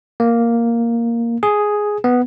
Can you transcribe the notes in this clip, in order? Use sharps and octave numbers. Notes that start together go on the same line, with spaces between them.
A#3
G#4
B3